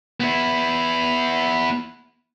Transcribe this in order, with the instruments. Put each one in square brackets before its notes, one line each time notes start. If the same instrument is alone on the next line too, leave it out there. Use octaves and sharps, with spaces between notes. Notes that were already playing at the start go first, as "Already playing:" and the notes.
[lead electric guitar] B3 E4